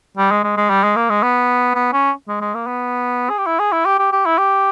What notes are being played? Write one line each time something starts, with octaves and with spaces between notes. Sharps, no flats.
G3
G#3
G#3
G#3
G3
G#3
A#3
G#3
B3
B3
C#4
G#3
G#3
A#3
B3
G#4
G4
E4
G#4
E4
G4
G4
G4
E4
G4